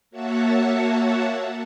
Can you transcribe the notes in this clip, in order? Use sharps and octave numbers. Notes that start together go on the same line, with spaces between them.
A#3 F#4 C#5 E5 F#5 A5